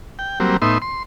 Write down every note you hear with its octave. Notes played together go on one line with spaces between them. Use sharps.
G5
F#3 G3 A#3 C4
A2 B3 D#4 E5 C6
C6